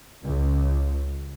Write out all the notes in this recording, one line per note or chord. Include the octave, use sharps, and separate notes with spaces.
C#2